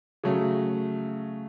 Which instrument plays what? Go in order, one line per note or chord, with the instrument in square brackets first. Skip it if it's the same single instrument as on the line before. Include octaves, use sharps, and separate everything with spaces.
[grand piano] C#3 F#3 A3